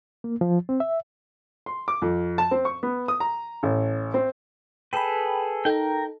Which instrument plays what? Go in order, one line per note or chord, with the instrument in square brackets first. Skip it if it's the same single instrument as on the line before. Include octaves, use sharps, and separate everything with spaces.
[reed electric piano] A#3
F3
C4
E5
[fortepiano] C6
D6
F2
A5
C4
C#6
B3
D#6
A#5
A1
C4
[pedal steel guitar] G#4 A4 B4 [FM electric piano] G5 B5
[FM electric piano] D#4 A4 [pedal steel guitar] A#4 G5